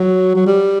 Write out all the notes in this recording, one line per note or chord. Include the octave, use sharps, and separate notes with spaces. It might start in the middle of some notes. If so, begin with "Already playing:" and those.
Already playing: F#3
F#3
G3